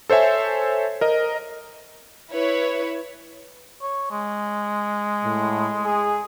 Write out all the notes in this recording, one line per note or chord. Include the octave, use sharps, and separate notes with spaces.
A4 C5 C#5 E5 G#5
A#4 D#5
E4 B4 C#5
C#5
G#3
A2
G#4